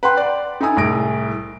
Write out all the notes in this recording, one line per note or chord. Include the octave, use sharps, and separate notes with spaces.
B4 F#5 G5 C6
D5
D#4 E4 A4 G#5 D#6
C2 A2 G#4 A#6 D7